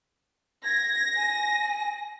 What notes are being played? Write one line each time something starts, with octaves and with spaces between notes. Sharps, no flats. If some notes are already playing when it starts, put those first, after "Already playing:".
G#6 A#6
G#5